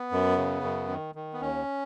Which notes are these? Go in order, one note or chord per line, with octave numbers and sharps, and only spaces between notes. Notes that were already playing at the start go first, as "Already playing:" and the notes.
Already playing: B3
F#2
C#3
F#2
D#3
D#3
B3
D#2 C#4